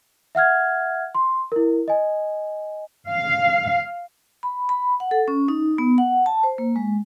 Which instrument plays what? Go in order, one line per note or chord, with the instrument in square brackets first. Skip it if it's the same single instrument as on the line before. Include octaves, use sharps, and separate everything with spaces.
[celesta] E5 F#5 F6 G#6
C6
E4 A#4
D#5 G#5
[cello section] F5
[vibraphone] B5
B5
F#5
A4
C#4
D#4
B3
F#5
A5
C5
A#3
G#3